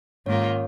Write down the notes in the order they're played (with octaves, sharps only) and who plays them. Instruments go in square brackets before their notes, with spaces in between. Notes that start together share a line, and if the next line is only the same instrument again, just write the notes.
[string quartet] G#2 D#3 A#3 F4 A#4 [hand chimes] C#4 C#5